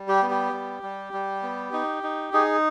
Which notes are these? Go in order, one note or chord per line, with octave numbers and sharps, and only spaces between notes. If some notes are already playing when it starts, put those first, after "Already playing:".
Already playing: G3
G4
B3
G4
G3
G3
G3
B3
D#4
D#4
D#4 G#4